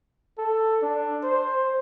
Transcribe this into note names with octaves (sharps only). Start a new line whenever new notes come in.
A4
D4
C5